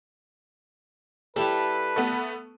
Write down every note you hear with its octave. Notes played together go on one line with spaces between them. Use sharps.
G3 E4 G4 A4 B4
A3 B3